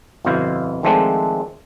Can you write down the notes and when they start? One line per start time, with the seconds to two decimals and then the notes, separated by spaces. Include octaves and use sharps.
0.25 G1 F2 B2 E4 C5 F5
0.83 D#3 F3 G#3 A3 C4 D4